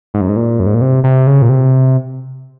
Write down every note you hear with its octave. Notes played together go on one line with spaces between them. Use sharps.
G#2
F#2
G#2
A#2
F#2
G#2
A#2
C3
C3
C#3
A#2
C3